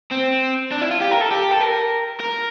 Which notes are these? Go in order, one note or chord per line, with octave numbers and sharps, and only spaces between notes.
C4
D4
E4
F4
G4
A#4
A4
G4
A4
A#4
A#4